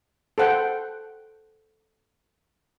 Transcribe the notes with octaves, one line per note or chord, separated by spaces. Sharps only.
A4 C5 F#5 G5